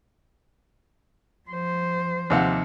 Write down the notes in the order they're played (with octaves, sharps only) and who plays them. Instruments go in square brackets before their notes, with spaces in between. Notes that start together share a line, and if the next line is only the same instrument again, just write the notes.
[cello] F3 C5
[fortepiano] D#2 C3 F#5 [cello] F3